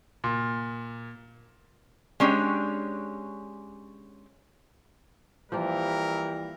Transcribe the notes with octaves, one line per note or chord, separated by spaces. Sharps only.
A#2
G#3 C#4 D4 G4
E3 F3 G3 A#3 G4 A#4